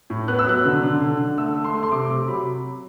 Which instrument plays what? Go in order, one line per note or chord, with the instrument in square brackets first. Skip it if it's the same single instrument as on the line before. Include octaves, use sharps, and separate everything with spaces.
[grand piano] A2
B3 F#6
E6
F#3 F#6
D3
D3
D3
D3
A3 E6
A3
C6
A3
C6
C3 D6
C3 D6
F#3 B5